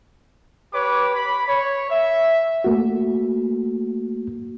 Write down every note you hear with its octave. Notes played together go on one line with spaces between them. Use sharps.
G4 B4 C#5 D6
B5
C#5
E5
A3 A#3 F#4